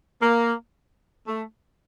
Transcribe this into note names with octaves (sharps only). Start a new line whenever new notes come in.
A#3
A3